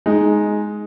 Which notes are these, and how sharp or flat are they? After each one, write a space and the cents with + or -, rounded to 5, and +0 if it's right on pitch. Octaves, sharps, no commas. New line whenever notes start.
G#3 +10 D#4 +0